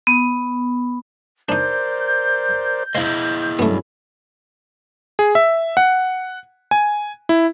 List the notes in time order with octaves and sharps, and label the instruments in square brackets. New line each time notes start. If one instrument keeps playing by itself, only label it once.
[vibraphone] B3
[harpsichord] D4 D#4 [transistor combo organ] A#4 C5 D5 [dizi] G6
[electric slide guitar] E4 G#4 D#5 [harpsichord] C5 F5
[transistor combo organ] G2 F#3 C#4 [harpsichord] A3 B3 [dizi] B5
[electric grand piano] G#4
E5
F#5
G#5
E4